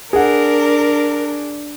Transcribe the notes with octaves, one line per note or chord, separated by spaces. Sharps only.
D4 G#4 A#4 F#5